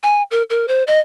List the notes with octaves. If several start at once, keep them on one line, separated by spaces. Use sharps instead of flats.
G#5
A#4
A#4
C5
D#5